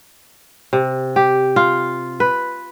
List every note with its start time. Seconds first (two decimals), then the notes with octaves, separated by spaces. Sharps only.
0.73 C3
1.16 G4
1.56 F4
2.20 B4